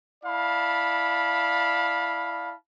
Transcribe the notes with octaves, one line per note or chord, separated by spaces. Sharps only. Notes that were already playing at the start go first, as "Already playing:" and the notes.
E4 D5 F5 A5 B5